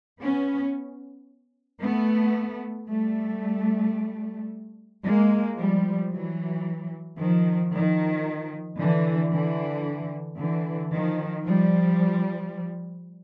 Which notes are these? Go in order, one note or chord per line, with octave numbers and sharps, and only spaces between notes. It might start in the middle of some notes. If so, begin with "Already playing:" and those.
B3 C#4
A3 B3
G3 A3
G#3 A#3
F3 G3
E3 F#3
D#3 F3
D#3 F3
D3 E3
D3 E3
D3 E3
D#3 F3
F3 G3